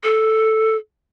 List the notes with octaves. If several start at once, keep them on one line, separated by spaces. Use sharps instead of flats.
A4